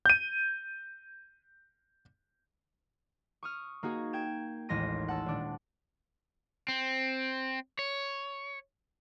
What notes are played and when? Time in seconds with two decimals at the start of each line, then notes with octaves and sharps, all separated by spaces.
0.06 G6 D#7
3.43 C#6 D#6 F6
3.83 A#3 D#4 F#4 G#4
4.13 G5 G#6 E7
4.69 A1 D#2 G#3 C6 A#6 D#7
5.08 F#5 A5 E6
5.26 D#1 D4
6.68 C4
7.79 C#5